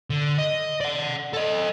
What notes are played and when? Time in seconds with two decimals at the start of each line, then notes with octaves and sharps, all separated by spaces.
0.10 D3
0.38 D#5
0.81 D5 F#5
1.33 A4 D#5